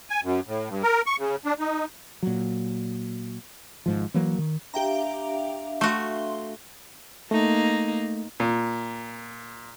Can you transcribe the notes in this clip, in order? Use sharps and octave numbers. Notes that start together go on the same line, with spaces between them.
G#5
F#2
A2
G2
A#4
C#6
C#3
D4
D#4
A#2 F#3
G#1 G#2 F3
E3 F#3 A#3
D#3
D4 G4 E5 F5 G5 A#5
A3 F#4 C6
A3 A#3 D#4
A#2